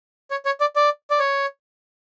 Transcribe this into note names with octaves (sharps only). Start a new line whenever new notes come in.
C#5
C#5
D5
D5
D5
C#5